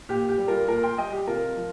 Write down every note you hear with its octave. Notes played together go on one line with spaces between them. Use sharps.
A#2 G4
G4
G3
F4 A#4
A#2 F4 A#4
G5 C6
G3 D#5 G5
G4
C3 F4 A#4
F3